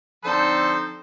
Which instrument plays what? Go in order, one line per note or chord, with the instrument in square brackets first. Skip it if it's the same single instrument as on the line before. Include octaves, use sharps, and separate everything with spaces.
[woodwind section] D3 F3 C4 D#4 [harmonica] A4 C5